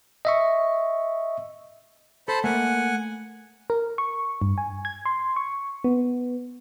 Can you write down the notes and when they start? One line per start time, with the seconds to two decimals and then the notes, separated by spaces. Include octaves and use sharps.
0.25 D#5 E5 C#6
2.28 A4 C5 A5 B5
2.44 A3 A#3 F#5 G#5
3.70 A#4
3.98 C#6
4.42 G2
4.58 G#5
4.85 G#6
5.05 C6
5.36 C#6
5.84 B3